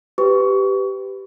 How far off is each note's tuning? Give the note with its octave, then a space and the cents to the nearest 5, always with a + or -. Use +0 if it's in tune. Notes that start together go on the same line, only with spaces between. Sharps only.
G4 -5 B4 +20 C#6 +30